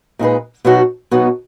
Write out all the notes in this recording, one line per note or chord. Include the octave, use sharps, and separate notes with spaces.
A#2 G#3 D#4 G#4 B4
B2 F#3 B3 D#4 F#4
B2 F#3 B3 D#4 F#4